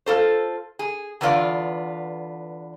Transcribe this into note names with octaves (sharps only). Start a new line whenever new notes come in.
F4 A4 C5
G#4
E2 D3 B3 F4 D5